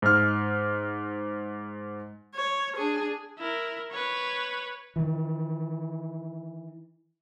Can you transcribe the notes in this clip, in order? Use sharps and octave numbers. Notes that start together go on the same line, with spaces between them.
G#2 F6
C#5
D4 G#4
E4 A#4
B4 C#5
D#3 E3